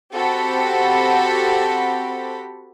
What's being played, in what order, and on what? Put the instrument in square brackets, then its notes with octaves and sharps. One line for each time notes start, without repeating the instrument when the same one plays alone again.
[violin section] C4 F#4 G4 A4 F#5 B5